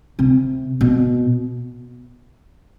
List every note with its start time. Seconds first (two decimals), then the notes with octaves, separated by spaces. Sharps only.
0.19 C3
0.81 B2